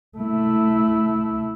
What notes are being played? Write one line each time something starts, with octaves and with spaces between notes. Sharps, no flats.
A3 E4